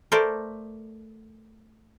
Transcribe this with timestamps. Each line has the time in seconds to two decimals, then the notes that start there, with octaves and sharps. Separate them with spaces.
0.12 A3 A#4 C5 D5